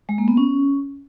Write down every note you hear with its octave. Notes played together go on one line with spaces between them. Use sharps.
G#3
A#3
B3
C#4